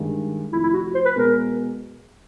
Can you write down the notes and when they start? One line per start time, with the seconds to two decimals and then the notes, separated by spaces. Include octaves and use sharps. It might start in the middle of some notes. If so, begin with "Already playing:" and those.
Already playing: G2 D#3 G#3
0.53 F1 F2 C3 E4
0.63 E4
0.74 F#4
0.95 C5
1.05 B4
1.16 B2 G#3 B3 A#4